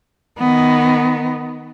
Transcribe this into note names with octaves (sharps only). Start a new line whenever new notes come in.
D#3 B3